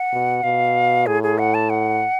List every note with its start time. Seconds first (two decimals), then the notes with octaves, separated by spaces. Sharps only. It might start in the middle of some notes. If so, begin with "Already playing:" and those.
Already playing: F#5
0.12 B2
0.43 B2 F5
1.06 A2 G#4
1.23 G#4
1.39 F#5
1.54 A5
1.70 F#5